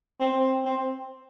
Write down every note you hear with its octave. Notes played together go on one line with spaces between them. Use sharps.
C4
C4